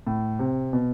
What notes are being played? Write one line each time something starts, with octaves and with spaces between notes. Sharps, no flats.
A2
C3
B2